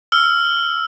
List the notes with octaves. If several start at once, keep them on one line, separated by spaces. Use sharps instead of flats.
E6 F6